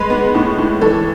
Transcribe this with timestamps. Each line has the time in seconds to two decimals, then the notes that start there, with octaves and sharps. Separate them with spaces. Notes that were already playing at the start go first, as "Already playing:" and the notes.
Already playing: G#3 B4
0.10 B3
0.35 A2
0.58 A2
0.81 E3 A4